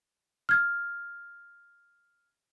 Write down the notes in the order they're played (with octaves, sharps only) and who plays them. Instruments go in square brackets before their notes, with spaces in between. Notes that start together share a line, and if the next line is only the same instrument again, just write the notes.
[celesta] F6 G#6